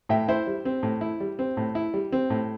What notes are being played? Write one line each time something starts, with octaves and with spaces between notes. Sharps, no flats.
A2 E5 G5
E4 C5 E5
G3
C4
A2
E4
G3
C4
A2
E4
G3
C4
A2